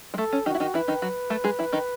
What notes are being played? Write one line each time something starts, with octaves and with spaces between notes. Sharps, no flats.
G#3
A3 A4
C#4
D#3 D#4 F#4
E4
D#3 D#4
E3 E4 B4
D#3 D#4
F#3 F#4
A3 A4
G#3 G#4
E3 E4
D#3 D#4